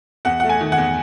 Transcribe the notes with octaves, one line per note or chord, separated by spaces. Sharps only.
E2 F#5
A3 F#5
G#5
D#3
F#5
E2